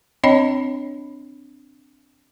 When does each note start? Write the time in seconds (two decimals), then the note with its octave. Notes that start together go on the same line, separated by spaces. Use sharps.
0.24 C4 D4 C#5 D#5 G5 B5